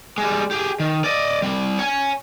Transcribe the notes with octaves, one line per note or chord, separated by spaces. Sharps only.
G3 G#3
G4 G#4
D#3
D5 D#5
G3 C4
C#5 G#5